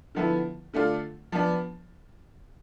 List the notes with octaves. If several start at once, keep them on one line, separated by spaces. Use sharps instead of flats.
D3 F3 B3 E4
D3 A3 D4 F4
F3 B3 D4